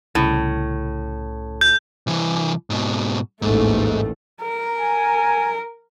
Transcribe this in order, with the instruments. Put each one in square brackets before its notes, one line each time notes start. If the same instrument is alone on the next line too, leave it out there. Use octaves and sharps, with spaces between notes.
[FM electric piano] C2 C#3 [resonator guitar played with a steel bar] A2
[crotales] G6
[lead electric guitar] C2 E3
G#2 B2
[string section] A1 D#2 A3 [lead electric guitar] G#2
[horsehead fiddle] A#4
[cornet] G#5